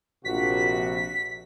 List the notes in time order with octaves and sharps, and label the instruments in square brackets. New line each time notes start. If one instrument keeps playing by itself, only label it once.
[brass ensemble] A#1 C3 F#4 [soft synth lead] B6